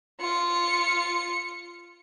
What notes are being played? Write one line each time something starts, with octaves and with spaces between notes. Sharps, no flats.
F4 C#7